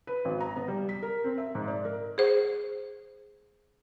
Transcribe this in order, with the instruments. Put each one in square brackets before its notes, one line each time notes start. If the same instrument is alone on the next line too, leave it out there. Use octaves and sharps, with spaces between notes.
[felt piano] B4
G#1
A#5
B3
G3
B6
A#4
C4
E5
G#2
D5
A#4
[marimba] G#4 C5